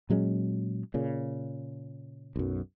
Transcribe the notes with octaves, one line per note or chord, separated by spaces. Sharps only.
A#2 F#3 G#3 C#4
A#2 C#3
B1 F#2